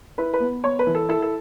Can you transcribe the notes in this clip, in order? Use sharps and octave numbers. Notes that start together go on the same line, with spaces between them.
E4 B4
B4
B3
B3 C#5
B4
E3
A4
E4 A4
A4